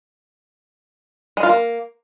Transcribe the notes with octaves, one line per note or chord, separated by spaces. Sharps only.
G#3
F4
A#3